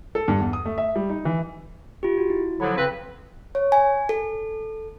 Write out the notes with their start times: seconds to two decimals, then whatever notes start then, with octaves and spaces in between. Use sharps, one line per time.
0.15 A4
0.28 G2
0.40 E2
0.53 D#6
0.65 A3
0.78 E5
0.96 G3
1.10 D#4
1.25 E3
2.03 F4 G4
2.18 F#4
2.30 E4
2.60 D3 F3 F#3 B5
2.76 C#3 C4 B4
3.55 C#5
3.72 G#5
4.09 A4